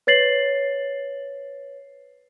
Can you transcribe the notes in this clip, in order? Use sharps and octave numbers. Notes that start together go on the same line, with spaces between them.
B4 C#5 A6 C7 F#7